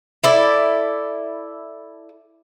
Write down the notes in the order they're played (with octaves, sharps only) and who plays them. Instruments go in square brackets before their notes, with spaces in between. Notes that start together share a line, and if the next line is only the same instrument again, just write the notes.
[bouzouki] E4 A4 D5